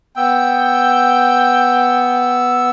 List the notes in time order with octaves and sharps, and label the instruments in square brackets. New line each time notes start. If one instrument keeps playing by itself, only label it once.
[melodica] B3 E6 [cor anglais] G5